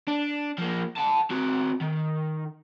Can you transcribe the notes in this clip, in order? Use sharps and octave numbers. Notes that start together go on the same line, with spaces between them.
D4
F3 A#3
F#5 A5
C4 F#4
D#3